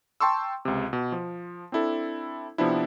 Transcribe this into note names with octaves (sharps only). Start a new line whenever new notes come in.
G5 A5 C6 C#6 E6
C#2 C3
B2
F3
C4 D4 E4 A4
C3 F3 B3 C4 D4 E4